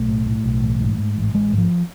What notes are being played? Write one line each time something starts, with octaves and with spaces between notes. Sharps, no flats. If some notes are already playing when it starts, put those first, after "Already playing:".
Already playing: B1 A3
A2
A2
B1
A1
G#2
G#2
A1
A1 G#3
G#2
F3